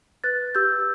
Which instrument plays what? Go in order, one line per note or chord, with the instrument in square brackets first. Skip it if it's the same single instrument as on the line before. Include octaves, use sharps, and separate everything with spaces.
[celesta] B4 F#6 A6
G4 E6 G6